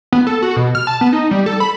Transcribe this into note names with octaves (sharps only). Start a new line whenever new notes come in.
B3
A4
F#4
B2
F6
A5
B3
D#4
G3
A4
B5